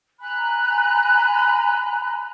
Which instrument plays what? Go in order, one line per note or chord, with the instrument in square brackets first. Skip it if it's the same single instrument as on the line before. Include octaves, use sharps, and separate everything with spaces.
[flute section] G#5 A#5 B5 F#6